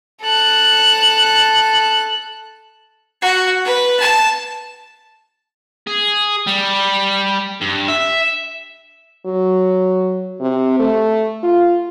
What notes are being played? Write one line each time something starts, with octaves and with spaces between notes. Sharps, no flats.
A4 F#6
F#4
B4
A5
G#4
G3
G2
E5
F#3
C3
A3
F4